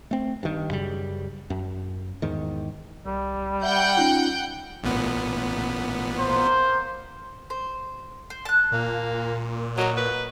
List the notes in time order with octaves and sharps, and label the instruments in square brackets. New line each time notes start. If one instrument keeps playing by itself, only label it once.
[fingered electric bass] A3 C4
G2 D#3
F#2 C#3 G3
F#2
E2 G#2 D#3
[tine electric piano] C2 [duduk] G3
[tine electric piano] E5 [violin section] F#5 G5 G6
[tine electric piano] C#4 D#4 F4
[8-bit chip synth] A1 A#2 B3
[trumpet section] A#3 C5
[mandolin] C5
C5
A5 F#6
[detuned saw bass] A#2 [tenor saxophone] A#3
[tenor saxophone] F#3 [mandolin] F#4 A#4 D#5
[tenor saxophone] B4